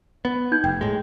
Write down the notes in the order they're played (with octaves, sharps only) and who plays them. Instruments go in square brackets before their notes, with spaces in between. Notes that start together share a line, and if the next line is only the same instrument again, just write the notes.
[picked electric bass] B3
[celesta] D#4 G6 G#6
[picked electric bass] F1 [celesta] G5
[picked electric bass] A2 G#3